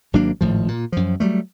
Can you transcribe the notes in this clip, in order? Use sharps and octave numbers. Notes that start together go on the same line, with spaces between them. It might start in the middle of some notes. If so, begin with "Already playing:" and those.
G#1 F#3 A#3 D4
G#1 A2 F3
A#2
F#2 F3
F#3 G3 A3